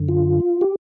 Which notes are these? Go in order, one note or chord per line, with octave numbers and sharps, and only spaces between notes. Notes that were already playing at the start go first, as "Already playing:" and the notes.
Already playing: F#2 D3
F4
G4